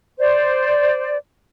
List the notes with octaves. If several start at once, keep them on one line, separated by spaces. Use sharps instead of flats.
C5 D5